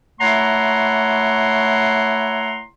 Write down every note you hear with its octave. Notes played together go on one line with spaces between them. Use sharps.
A3 E4 C#5 F#5 A#5 C6